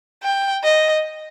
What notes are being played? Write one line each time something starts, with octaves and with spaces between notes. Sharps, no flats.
G5
D#5